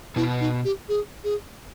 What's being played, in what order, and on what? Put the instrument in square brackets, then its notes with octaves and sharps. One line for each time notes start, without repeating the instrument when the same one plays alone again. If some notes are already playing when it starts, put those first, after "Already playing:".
[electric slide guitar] B2 B3 [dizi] E4
[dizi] D#4
G4
G#4
G#4